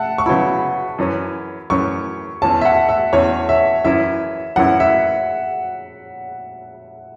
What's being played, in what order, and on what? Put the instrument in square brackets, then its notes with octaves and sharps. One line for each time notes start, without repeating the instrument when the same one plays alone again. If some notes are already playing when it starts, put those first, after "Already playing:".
Already playing: [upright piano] E5 F#5 A5
C#6
[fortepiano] C#3 F#3 B3 E4 [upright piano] B5
[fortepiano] F#2 E3 C#4
[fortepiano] F#2 E3 C#4 [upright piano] C#6
[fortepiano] E2 E3 C#4 [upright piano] A5
[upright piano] E5
F#5
E5
[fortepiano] E2 E3 C#4 [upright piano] C#5
[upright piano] E5
[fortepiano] F#2 E3 C#4 E4 [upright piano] E5
[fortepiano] F#2 E3 C#4 E4 [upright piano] F#5
[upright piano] E5